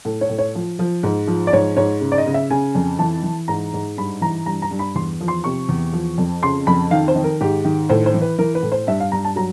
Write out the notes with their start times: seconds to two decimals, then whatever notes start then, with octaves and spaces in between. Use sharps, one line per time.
0.05 A2
0.21 C#5
0.29 A2
0.38 C#5
0.55 F3
0.79 F3
1.03 G#2
1.27 F3
1.47 D5
1.53 G#2 C#5
1.77 G#2 C#5
2.01 C#3
2.12 D5
2.18 D#5
2.26 C#3
2.34 E5
2.50 C#3 G#5
2.75 F2
2.99 E3 A5
3.23 E3
3.48 G#2 A#5
3.73 G#2
3.97 G2 B5
4.21 E3 A#5
4.46 G2 A#5
4.62 A#5
4.71 G2
4.79 B5
4.95 E2 C6
5.21 F3
5.28 C6
5.44 C3 C#6
5.69 E2
5.93 F3
6.18 F2
6.43 C#3 C6
6.67 F2 B5
6.91 D#3 F5
7.08 C5
7.16 D#3
7.24 A#4
7.41 G#2 G4
7.65 D#3
7.89 A2 C5
8.06 C5
8.14 E3
8.22 B4
8.39 E3 A#4
8.55 B4
8.63 A2
8.72 C5
8.87 G2 E5
9.00 F5
9.12 G2 A#5
9.24 A5
9.36 F#3 A#5